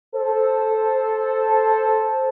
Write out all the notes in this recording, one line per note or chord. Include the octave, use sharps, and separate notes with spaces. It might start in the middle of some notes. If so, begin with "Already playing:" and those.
A4 C5